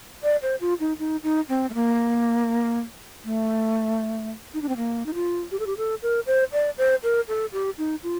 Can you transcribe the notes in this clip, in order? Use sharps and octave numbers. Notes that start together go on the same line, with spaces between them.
D5
C5
F4
D#4
D#4
D#4
C4
A3
A#3
A3
D#4
D4
C4
A#3
D#4
F4
G4
A4
G4
A4
A#4
C5
D5
C5
A#4
A4
G4
D#4
F4